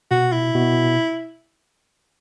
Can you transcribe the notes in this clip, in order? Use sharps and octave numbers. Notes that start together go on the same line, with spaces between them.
B2 F#4
E4
B2